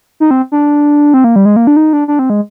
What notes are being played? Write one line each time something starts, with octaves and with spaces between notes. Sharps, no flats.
D#4
C4
D4
C4
A#3
G3
G#3
A#3
D4
D#4
D4
D4
C4
G#3